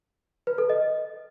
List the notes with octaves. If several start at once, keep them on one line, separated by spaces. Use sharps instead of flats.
B4
A4
D#5